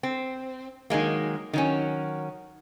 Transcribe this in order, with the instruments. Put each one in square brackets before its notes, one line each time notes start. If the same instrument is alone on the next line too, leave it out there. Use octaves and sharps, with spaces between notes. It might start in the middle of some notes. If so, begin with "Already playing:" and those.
[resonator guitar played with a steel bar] C4
D#3 F#3 G#3 A#3
D#3 F#3 C#4